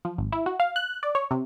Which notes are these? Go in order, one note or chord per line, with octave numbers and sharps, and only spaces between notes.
F3
G#1
E4
F#4
F5
F#6
D5
C#5
C3